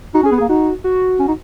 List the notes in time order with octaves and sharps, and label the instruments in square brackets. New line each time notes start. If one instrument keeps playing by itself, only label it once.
[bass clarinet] D#4 [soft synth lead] F#4
[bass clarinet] C#4
[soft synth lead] G#4
[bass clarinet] B3
[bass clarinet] A#3 [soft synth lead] G#4
[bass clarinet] D#4 [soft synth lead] F#4
[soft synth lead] F#4
[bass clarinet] C#4
D#4